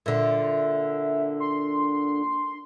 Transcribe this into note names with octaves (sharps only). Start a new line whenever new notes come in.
A#2 D3 E5
C6